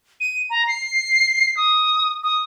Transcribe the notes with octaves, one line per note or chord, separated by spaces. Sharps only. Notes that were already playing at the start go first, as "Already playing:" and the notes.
D#7
A#5
C7
D#6
D#6